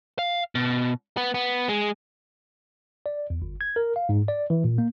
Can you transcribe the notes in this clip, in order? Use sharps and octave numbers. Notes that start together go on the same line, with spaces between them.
F5
B2
B3
B3
G#3
D5
E2
G1
G#6
A#4
F5
G#2
D5
E3
A#2
A#3